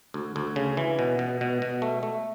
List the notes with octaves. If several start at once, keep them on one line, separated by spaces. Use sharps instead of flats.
D2
D2
C#3
E3
B2
B2
B2
B2
A3
A3